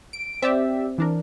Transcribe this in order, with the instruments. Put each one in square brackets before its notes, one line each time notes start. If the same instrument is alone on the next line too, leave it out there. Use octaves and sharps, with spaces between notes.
[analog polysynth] D7
[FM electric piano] C4 [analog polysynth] G4 D5 E5
[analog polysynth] E3 D4 A#4